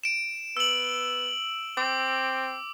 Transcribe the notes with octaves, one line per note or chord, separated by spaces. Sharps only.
D7 E7
B3 E6 F#7
C4 D6